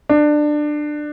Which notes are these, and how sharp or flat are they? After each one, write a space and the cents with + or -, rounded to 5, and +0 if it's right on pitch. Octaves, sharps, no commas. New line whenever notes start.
D4 +20